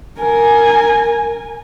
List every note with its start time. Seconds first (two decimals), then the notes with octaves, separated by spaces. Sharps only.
0.21 A#4 G#5